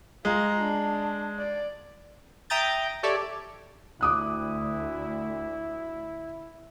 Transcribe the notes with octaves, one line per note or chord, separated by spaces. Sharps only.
G#3 F4 A#5
D4
D5
E5 G5 A#5 D#6 G6 A6
G4 A4 C#5 D5 E5
D2 E4 D6 D#6 F#6